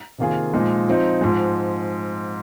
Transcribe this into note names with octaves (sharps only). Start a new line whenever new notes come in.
C3 D#3 A#3 F4 G#4
A#2 F3 G#3 D#4
F3 C4 D#4
G#2 F3 G#3